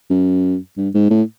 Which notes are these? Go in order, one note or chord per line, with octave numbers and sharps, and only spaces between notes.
F#2
G2
G#2
A2